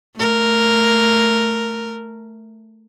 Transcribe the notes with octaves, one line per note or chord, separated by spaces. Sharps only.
A3 A#4